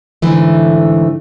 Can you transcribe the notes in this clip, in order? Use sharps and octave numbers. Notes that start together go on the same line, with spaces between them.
G#2 D3 E3 A3